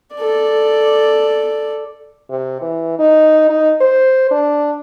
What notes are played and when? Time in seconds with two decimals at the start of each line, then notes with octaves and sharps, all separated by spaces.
0.16 A4 D5
2.30 C3
2.61 E3
2.99 D#4
3.50 D#4
3.81 C5
4.31 D4